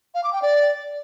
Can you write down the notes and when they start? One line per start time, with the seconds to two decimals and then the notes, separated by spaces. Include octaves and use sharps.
0.15 F5
0.24 D6
0.33 G5
0.42 D5